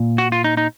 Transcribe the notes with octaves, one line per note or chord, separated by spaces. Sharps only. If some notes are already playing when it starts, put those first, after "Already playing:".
Already playing: A#2
F#4
F4
D#4
D#4